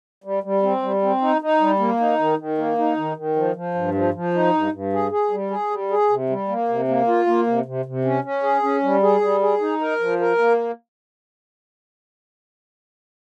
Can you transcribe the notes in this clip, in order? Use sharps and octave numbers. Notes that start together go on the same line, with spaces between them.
G3
G3
C4
G3
C4
D#4
D#4
G3
A#3
D#4
D#3
D#3
A#3
D#4
D#3
D#3
F3
F3
G2
F3
F3
D#4
G2
G2
G#4
G#4
G3
G#4
G3
G#4
C3
G3
A#3
C3
A#3
F4
A#3
C3
C3
C3
C#4
C#4
G#4
C#4
G3
G#4
G3
G#4
D#4
A#4
F3
A#4
A#3